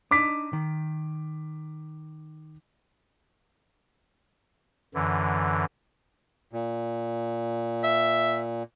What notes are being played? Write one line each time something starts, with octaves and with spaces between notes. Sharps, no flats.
D4 D#4 D6 B6
D#3
F#2 D3 E3
A#2
E5